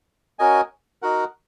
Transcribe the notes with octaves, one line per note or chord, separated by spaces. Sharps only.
C#4 F#4 A#4 D#5 G#5
D#4 F#4 A#4 F#5